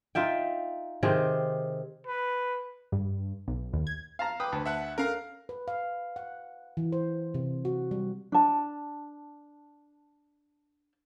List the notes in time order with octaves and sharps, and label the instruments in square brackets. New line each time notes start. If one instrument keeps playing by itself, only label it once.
[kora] D#4 F4 E5 G5
C3 D#3 C4 G#4
[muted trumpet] B4
[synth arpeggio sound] G2
B1
D#2
G#6
[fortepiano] F5 A5 A#5
[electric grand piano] B4 [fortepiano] G5 D6 [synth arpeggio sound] D#6
[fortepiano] D2 [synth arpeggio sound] A5
[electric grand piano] E5 F#5 F#6
[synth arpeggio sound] C#4 A4 [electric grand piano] A#4 F5 A#5
[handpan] B4
F5
F#5
E3
C5
C3
F#4
G3
[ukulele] D4 A5